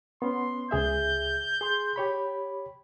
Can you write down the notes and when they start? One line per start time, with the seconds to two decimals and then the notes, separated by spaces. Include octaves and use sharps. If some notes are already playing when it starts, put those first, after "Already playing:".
0.22 B3 C#4 C6
0.71 C#2 G#4 E5 G6
1.61 G#4 C6
1.96 G4 C#5 B5